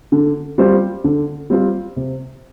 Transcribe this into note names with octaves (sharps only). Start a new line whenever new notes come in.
D3
G3 C4 F4 C5
D3
G3 C4 F4 C5
C3